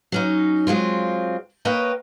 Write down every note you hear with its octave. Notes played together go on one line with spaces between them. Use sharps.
F#3 C#4 D#4
F#3 G#3 C4 F4
A#3 B4 C#5 D#5 G5